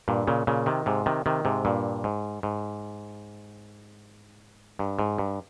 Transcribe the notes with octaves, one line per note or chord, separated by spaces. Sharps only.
G2 A#2
A#2 C#3
A#2 C#3
C3 D#3
G#2 C3
C3 D#3
C3 D#3
G#2 C3
G2 A#2
G#2
G#2
G2
G#2
G2